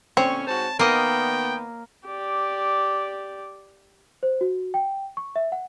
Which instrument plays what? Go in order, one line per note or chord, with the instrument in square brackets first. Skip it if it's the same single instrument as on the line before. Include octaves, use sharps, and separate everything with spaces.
[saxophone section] A#2 D3 C#4 [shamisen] C4 [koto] C#5
[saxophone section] G#2 F#4 C5 [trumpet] A5
[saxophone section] D#3 B3 [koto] A#3 D#5 [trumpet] G5
[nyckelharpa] G4 D5
[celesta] C5
F#4
G5
C#6
E5
F#5